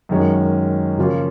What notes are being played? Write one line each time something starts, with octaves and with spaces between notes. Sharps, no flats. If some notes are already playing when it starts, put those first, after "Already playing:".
F#2 D#3 G#3 C#4
C#3 F3 A#3 C#4 F4